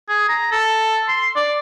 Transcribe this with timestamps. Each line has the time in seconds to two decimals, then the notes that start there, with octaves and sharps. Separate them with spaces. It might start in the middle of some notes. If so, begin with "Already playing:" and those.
0.09 G#4
0.29 A#5
0.52 A4
1.08 C6
1.36 D5